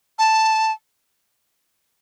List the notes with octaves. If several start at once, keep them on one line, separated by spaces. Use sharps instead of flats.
A5